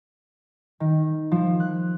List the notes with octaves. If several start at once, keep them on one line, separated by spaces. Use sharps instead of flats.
D#3
F3
F#6